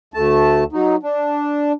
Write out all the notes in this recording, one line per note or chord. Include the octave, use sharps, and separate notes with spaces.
D2 A3 A5
F#3 D#4
D4